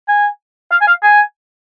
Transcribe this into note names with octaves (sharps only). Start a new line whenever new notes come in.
G#5
F5
G#5
F5
G#5